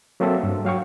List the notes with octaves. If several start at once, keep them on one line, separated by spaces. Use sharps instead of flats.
F#3 A#3 C4 A4 E5
G2
F#3 F5 G5 C#6